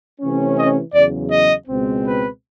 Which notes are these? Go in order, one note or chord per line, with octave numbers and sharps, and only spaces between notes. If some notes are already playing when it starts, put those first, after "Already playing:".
C3 E3 A3 C#4
D#5
E2 C#3 F#3 D5
D#5
C#2 B2 G#3 C4
B4